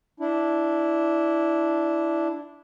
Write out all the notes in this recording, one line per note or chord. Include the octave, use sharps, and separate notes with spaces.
D4 E4